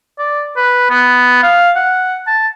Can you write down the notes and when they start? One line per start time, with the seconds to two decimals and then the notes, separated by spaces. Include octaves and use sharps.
0.18 D5
0.57 B4
0.90 B3
1.43 F5
1.76 F#5
2.27 A5